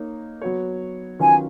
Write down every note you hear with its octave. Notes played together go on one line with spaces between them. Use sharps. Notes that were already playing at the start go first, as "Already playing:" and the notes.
Already playing: A#3 D#4 C#5
F#3 B3 F#4 C#5
D#3 F#3 C#4 F4 B4 G#5